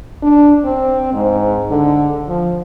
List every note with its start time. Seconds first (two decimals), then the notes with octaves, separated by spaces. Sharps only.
0.23 D4
0.64 C4
1.13 G#2
1.70 D3
2.28 F3